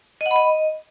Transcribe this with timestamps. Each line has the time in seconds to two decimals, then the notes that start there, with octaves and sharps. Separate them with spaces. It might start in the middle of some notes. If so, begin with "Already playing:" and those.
0.21 D#5
0.26 F#5
0.31 B5
0.36 D#5